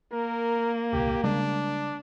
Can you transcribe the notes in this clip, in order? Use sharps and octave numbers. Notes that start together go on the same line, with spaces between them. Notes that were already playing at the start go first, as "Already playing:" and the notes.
A#3 A#4
D#1 C2 G4
C#3 G3 G#3 D4